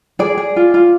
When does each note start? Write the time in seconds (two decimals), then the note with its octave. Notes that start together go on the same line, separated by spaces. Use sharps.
0.19 G#4 D5
0.37 G#4
0.56 F4
0.74 F4